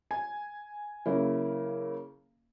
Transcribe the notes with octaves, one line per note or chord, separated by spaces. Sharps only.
G#5
C#3 F#3 A#3 E4